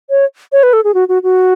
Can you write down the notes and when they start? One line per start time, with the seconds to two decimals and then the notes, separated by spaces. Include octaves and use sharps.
0.10 C#5
0.52 C#5
0.63 B4
0.73 A4
0.84 G#4
0.94 F#4
1.09 F#4
1.23 F#4